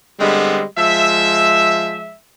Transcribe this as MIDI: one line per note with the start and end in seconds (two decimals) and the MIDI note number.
0.20 0.64 50
0.20 0.64 55
0.20 0.64 56
0.20 0.64 59
0.20 0.64 60
0.78 2.16 53
0.78 2.16 56
0.78 2.16 76